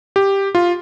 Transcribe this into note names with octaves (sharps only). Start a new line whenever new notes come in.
G4
F4